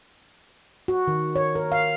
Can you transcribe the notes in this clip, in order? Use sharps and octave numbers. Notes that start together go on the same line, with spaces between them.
F#4
D#3
C#5
A#4
F5